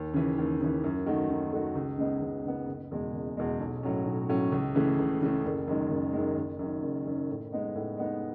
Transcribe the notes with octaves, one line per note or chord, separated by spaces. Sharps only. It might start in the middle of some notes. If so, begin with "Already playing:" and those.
Already playing: D#2
C#3 E3
D#2
C#3 E3
F#2
D#3 A3 D#4 F#4
F#2
D#3 A3 D#4 F#4
C#2
C#3 G#3 B3 D#4
C#2
C#3 G#3 B3 D#4
F#1
E2 B2 G#3
F#1
E2 B2 G#3
B1
A2 F#3 C#4
B1
A2 F#3 C#4
C#2
C#3 E3 A3
C#2
C#3 E3 A3
F#1
F#2 D#3 G#3
F#1
F#2 D#3 G#3
F#1
F#2 D#3
F#1
F#2 D#3
A2
G#3 B3 D#4
A2
G#3 B3 D#4